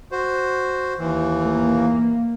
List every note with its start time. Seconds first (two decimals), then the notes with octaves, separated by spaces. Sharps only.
0.12 F#4 C5
0.99 D#2 E3
1.43 A#3